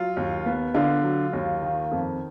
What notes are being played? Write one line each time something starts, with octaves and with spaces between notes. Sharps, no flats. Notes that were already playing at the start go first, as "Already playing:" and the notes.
Already playing: F#3 F4
D#2
B3
D3 F4
F#3
D#2
D#3
F2